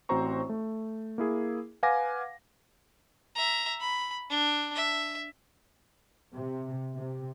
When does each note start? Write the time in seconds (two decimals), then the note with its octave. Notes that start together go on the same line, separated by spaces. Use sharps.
0.09 A1 C4 F#4 C5 A#5 C#6
0.49 A3
1.18 A#3 E4 G#4
1.83 B4 F5 F#5 G#5 D6 A#6
3.35 E5 A#5
3.81 B5
4.30 D4
4.76 E5
6.33 C3
6.96 C3